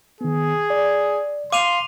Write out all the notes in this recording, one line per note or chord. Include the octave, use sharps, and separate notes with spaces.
D#3 B3 G#4
D5
F5 C6 D6 D#7 F7